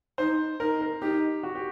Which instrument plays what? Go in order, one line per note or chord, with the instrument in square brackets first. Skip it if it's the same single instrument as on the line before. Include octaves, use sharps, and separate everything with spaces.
[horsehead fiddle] D#4 [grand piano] C5
[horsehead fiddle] D#4 [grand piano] A#4
[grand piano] A#4
[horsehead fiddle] D#4 [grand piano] G4
[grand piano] F#4
G4